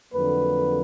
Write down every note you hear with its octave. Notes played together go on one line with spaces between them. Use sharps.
F2 D3 F#3 A#3 B4